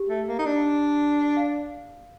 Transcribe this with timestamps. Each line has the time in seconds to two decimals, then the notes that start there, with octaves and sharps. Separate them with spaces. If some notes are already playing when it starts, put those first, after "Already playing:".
Already playing: G4
0.09 A3
0.28 A#3
0.39 D#4
0.46 D4
1.37 F5